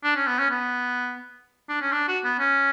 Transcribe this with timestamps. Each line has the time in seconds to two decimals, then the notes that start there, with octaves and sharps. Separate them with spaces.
0.03 D4
0.16 C#4
0.27 B3
0.39 C#4
0.50 B3
1.69 D4
1.81 C#4
1.92 D4
2.08 F#4
2.24 B3
2.39 C#4